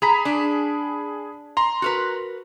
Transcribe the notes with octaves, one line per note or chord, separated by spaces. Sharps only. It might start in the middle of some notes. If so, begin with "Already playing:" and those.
G#4 A#5 B5 B6
D4
A#5 C6
F#4 A#4 B4